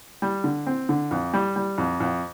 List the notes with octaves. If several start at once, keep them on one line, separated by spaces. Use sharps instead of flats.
G3
D3
C4
D3
F2
G3
G3
F2
F2